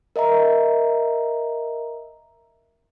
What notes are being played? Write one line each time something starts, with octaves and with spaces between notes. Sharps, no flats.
A#4 D#5 E5 A#5